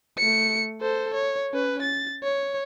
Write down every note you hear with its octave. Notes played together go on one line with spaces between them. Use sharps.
A3 C#7
A4 C5
C#5
C#4 B4
A6
C#5